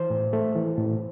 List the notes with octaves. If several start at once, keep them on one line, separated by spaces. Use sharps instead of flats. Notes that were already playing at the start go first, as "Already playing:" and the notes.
Already playing: E3 C5
A2
A3
E3
A2